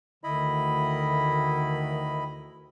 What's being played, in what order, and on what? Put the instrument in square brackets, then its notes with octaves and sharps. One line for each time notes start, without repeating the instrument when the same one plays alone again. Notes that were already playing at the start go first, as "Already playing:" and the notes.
[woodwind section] D2 D3 [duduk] D#3 [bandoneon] E4 D#5 B5